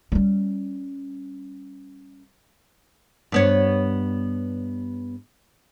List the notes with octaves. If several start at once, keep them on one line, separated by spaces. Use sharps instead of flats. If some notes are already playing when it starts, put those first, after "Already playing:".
G3 C#4
G2 B3 C#5